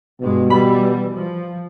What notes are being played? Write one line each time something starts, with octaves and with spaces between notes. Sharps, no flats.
G2 B2 G#3
E3 G3 B5
F3